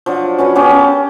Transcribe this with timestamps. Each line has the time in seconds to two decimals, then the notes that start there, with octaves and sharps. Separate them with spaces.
0.06 F3 F#3 D4 F#5
0.38 C#4 F#4 B4 C#5
0.55 B3 C#4 G4 D5
0.69 C#4 A4 A#4